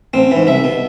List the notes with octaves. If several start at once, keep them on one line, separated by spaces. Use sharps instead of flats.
A1 C4
G#2 E3
C2 E5
B2